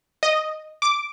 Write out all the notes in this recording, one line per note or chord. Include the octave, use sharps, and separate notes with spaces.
D#5
D6